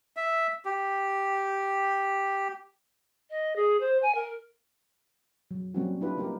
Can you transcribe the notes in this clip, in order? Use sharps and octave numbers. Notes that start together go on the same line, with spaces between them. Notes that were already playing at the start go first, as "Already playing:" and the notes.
E5
G4
D#5
G#4
C5
G#5
A#4
F#3
F#3 G3 A#3 C4 C#4 F#4
D4 E4 F4 G4 B4
G3 A#3 D#4 G4 A#4